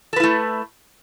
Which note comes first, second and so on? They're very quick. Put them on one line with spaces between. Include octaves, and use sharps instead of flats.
A4 B4 E4 A3